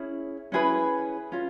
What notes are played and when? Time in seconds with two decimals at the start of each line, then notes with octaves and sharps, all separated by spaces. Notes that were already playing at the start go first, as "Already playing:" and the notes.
Already playing: C#4 E4 G#4
0.52 C#4 E4 G#4 B4
1.32 C#4 F4